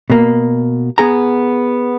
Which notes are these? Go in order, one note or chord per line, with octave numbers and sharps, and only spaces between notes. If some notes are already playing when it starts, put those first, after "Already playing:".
B2 A#3
B3 G#4 A#5